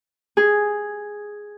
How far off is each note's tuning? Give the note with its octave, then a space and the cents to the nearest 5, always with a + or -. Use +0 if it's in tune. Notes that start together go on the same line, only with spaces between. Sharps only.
G#4 +0